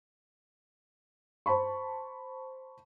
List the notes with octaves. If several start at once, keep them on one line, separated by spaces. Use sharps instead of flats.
C5 A5 B5 C#6